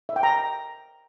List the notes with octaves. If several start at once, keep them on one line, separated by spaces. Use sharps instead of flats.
E5
G5
A#5